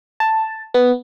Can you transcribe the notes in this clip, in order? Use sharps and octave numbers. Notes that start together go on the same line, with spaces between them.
A5
B3